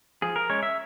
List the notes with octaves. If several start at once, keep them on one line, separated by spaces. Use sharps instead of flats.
F3 G#4
A#4
G#3 C#4 C#5
E5